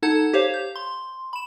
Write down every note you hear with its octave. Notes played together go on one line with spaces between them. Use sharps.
D#4 A4 F#5 A5 G#6
G4 C5 C#5 F5
G6
C6
B5 E7